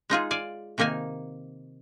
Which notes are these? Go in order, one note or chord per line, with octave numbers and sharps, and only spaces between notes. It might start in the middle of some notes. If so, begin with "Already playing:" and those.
G#3 D#4 F4 G#4
D5 F5 G#5
C3 D#3 A#3 D#4 G#5